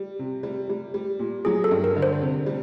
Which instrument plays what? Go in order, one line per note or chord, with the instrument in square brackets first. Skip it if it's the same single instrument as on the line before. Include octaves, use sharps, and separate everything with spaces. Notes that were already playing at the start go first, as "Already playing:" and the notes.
Already playing: [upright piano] G3
C3
G3
G3
G3
A#2
[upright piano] F#3 [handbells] G#4
[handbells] A4
[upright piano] G2
[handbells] A#4
[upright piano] D3
[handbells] C5
[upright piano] C3
G3